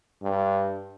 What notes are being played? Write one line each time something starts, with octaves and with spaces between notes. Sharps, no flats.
G2